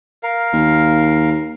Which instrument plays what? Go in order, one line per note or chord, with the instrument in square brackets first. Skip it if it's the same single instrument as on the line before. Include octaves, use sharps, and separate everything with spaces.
[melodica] A#4 F5
[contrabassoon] D#2